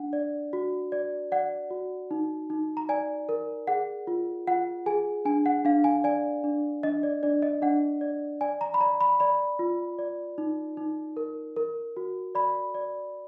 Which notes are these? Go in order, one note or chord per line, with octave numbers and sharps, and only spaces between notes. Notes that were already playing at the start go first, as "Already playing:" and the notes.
Already playing: D4 F#5
D5
F#4
D5
D5 F#5
F#4
D#4
D#4
A#5
D5 G#5
A#4
G#4 F#5
F4
F4 F#5
G#4 G#5
D4 G#5
F#5
D4 F5
G#5
D5 G#5
D4
D4 D#5
D5
D4 D5
D#5
D4 F#5
D5
D5 G#5
A#5
B5
D5 A#5
B5
D5 B5
F4
D5
D#4
D#4
A#4
A#4
F#4
D5 B5
D5